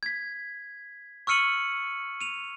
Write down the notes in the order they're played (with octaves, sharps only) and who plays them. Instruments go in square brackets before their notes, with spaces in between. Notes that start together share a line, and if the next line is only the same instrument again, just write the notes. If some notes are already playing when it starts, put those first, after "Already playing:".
[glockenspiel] G#6 B6
C#6 E6 F6 C#7 D#7 F#7
D#7 F7